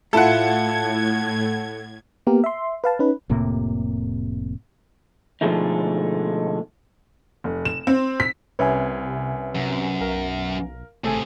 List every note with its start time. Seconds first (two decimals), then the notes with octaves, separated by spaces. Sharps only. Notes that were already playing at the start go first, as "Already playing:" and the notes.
0.13 A2 A3 E4 F4 A4 F#5 G#6
2.27 A#3 B3 G4 A#4
2.44 E5 C6
2.84 B4 F5 A5
2.99 C#4 D#4 B4
3.29 F1 A2 C3 A#3
5.41 B2 D3 F3 G#3 A3 D#4
7.44 F1
7.65 E7
7.87 C4
8.20 B6
8.59 C2 C3 C#4 B4 C#5 E5 G#5
9.55 F#2 C3
10.00 B1 A#4 F5
11.04 G#1 C3 A3 G#4 A4 G#5